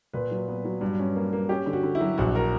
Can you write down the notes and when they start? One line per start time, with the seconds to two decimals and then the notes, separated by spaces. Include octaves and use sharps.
0.13 A#2 B4
0.31 F#3
0.48 B3
0.65 F#3
0.81 G2
0.99 C#4
1.16 A#3
1.33 A#3
1.49 C#4 G4
1.66 D3
1.73 F#4
1.83 D3
1.95 E4
2.01 F#3
2.18 A#1 F#4
2.35 A#4